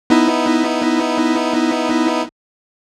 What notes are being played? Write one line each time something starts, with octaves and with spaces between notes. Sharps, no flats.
B3 D#4 E4